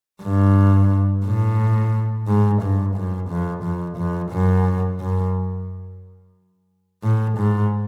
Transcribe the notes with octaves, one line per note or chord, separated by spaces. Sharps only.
G2
A2
G#2
G2
F#2
F2
F2
F2
F#2
F#2
A2
G#2